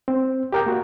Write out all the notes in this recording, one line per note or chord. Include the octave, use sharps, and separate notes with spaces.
C4
G4 A#4 G5
A#3 F#4